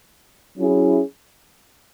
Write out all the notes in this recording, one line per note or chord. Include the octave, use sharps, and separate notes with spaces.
F#3 C#4 E4 G#4